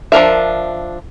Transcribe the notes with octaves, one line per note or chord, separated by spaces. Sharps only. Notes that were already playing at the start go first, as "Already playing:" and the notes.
F3 D4 A#4 E5